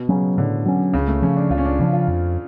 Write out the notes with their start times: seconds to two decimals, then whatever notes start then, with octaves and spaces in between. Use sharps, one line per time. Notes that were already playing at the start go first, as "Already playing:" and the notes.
Already playing: B2
0.09 C#3 F#3 C#4
0.38 A2 D3
0.65 F#3 C#4
0.93 C#2 C#3
1.08 A3
1.22 C#3 F3 C#4
1.37 D4
1.50 C#2 F4
1.58 C#4
1.65 D4
1.79 C#3 F3 C#4
1.93 F4
2.08 F2